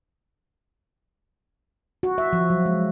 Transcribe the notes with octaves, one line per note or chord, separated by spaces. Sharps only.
F#4
E5
F3
F#3
G#3